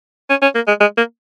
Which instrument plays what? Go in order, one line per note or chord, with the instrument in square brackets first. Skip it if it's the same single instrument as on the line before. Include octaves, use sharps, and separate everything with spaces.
[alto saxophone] C#4
C#4
A#3
G#3
G#3
A#3